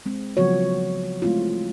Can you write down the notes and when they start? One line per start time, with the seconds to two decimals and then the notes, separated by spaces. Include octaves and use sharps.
0.06 G#3 C4
0.37 C#3 F3 F#3 B3 F#4 C#5
1.22 G#3 A3 C4 E4 F4